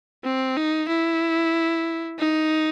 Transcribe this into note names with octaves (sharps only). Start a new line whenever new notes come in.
C4
D#4
E4
D#4